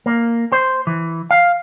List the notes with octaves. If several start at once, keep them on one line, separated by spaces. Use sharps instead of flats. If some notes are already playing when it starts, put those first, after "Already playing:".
A#3
C5
E3
F5